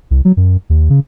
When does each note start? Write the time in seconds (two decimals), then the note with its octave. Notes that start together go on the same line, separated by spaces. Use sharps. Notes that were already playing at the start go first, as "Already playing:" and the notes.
0.11 C2
0.25 F#3
0.37 F#2
0.70 D#2
0.90 C#3